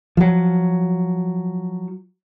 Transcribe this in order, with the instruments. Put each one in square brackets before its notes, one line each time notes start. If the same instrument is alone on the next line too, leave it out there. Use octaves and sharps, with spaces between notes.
[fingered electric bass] F3 F#3